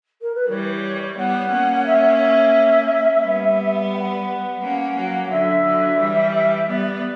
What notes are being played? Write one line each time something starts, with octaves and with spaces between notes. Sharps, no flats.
A#4
B4
E3 G3 C#5
G3 B3 F#5
A#3 C#4
E5
G3 B3
G5
F#5
A#3 C#4
F#3 A#3
D3 F#3 E5
D3 F#3
E3 G3
G3 B3 D5